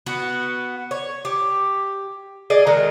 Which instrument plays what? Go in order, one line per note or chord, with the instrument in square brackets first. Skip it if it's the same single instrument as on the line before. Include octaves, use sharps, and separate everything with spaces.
[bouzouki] B3 F#4
C#5
G4
G#4 D5 D#5
D#3 F#3 G#3 A#4